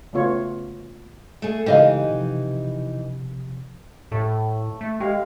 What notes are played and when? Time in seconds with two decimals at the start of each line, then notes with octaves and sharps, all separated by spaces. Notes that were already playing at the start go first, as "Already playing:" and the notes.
0.13 C#3 A3 B3 F4 C#5
1.42 A3 G#4
1.66 C#3 E3 G#3 D#4 G4 D#5 F5
2.09 C3 F3
4.12 A2 A3
4.81 A3
5.00 G#3 G4 F5